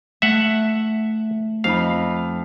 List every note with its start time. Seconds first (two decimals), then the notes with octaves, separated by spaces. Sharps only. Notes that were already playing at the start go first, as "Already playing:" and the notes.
0.22 A3 E5 F#5
1.64 F2 D#4 F5 B5